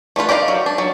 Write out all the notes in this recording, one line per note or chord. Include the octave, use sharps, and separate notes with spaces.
A3 D4 F4 B4
G4 A#4 D5 D#5 F5
F#3
D4
F#3